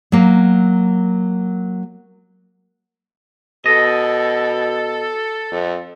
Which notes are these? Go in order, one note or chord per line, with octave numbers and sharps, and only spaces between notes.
F#3 A#3
B2 A4 D#5
F2